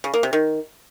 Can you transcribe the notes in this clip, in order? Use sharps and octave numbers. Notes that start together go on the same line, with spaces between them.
C#3
A#3
C3
D#3